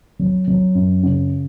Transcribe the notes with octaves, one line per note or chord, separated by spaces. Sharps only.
F#3
F#3
F#2
C#3